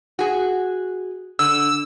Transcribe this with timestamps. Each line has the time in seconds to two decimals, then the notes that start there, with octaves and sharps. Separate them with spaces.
0.19 F#4 G#4
1.39 D3 E6